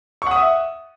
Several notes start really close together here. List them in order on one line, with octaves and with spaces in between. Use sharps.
C#6 F#5 D#6 E5